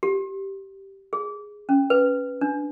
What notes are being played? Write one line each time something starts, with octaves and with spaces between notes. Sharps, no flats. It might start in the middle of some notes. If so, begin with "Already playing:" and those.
G4
G#4
C#4
B4
D4